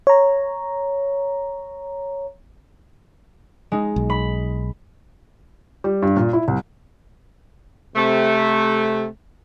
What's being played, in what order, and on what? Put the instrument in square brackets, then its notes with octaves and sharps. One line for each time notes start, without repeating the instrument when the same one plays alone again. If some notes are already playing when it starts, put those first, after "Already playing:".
[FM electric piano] C#5 A#5
[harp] G#3 D#4
[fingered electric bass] B1
[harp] B5
[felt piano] G3
G2
A#2
E4
C2
[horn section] C3 A3